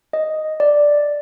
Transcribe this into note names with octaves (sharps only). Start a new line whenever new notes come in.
D#5
D5